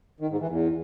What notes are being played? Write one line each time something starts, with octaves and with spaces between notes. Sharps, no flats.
D#3
G#2
E3
E2